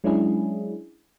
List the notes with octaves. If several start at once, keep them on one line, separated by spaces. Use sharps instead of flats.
F#3 G#3 C#4 D4 E4 G#4